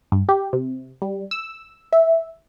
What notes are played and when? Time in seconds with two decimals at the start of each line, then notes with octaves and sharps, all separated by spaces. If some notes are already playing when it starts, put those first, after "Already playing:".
0.12 G2
0.29 G4
0.53 C3
1.02 G3
1.31 E6
1.92 E5